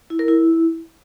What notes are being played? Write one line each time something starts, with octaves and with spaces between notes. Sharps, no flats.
E4
A#4
E4